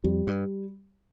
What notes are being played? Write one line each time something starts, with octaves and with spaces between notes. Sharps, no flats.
F2 G3
G2